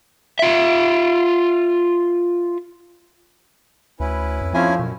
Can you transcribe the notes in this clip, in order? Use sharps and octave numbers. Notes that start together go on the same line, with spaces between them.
F4 E5
D2 C#4 E4 B4
F2
F3 A3 C4 C#4 E4 G#5
F#2 B2